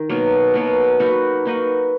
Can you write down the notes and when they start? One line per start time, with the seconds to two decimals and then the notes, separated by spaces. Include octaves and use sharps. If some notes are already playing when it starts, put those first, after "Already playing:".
Already playing: D#3
0.10 B2 F#3 A#3
0.54 B2 F#3 A#3
0.99 A#3 D#4 F#4 B4
1.45 A#3 D#4 F#4 B4